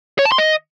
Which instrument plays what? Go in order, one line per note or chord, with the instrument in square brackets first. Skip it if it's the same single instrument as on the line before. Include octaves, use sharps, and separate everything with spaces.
[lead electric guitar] C#5
A5
C6
D#5